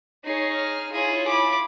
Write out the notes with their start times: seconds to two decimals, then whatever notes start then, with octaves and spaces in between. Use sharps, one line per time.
0.25 D#4 G#4 C#5 C7
0.55 F6
0.92 E4 F4 G#4 C#5
1.28 B5 D6